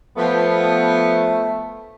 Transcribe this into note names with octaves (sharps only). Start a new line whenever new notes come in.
F3 A3 B3